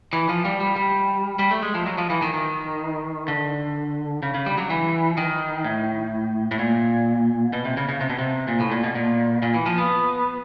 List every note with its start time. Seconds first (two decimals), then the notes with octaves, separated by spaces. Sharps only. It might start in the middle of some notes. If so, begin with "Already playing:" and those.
0.13 E3
0.29 F3
0.45 G3
0.60 G3
0.76 G3
1.39 G3
1.51 A3
1.63 G#3
1.74 F3
1.86 F#3
1.98 F3
2.10 E3
2.22 D#3
2.34 D#3
3.28 D3
4.23 C#3
4.34 C#3
4.46 G3
4.58 F#3
4.70 E3
5.17 D#3
5.64 A2
6.51 A2
6.59 A#2
7.53 B2
7.65 C3
7.77 C#3
7.89 C#3
8.01 C3
8.10 B2
8.19 C3
8.48 A#2
8.60 A2
8.72 A#2
8.84 B2
8.95 A#2
9.42 A#2
9.54 E3
9.66 F3
9.78 B3